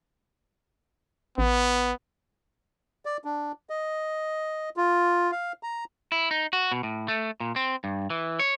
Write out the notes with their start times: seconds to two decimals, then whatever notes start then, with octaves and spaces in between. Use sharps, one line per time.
1.38 A1 B3
3.05 D5
3.25 D4
3.70 D#5
4.77 F4
5.32 F5
5.63 A#5
6.12 E4
6.31 D#4
6.53 F#4
6.72 B2
6.83 A2
7.08 A3
7.40 A#2
7.56 C4
7.84 G2
8.10 E3
8.39 C#5